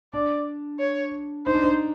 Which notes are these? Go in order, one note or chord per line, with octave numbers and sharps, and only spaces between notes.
D4 D5
C#5
D#4 C5
D4
D#4